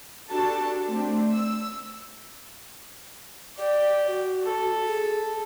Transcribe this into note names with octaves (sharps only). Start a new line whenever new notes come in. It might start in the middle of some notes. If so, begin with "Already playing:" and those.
D4 F#4 G4 A4 A5
A3 C4 D4
E6
G4 D5
F#4
A4
G#4